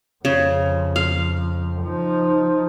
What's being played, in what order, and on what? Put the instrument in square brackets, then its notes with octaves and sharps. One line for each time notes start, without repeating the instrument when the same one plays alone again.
[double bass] F2 [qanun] C#3
[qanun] F5
[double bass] F3 D#4